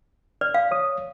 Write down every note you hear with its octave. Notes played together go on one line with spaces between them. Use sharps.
D5 F6
F5
C#5 D#6